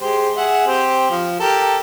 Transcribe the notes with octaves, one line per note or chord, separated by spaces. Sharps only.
G#3 G4 C5
G#4 E5 F#5
C4 G4 C5
F3
G4 A4 A#4